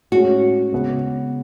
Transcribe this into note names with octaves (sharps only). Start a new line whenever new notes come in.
A2 G#3 C#4 F#4
C#3 G#3 B3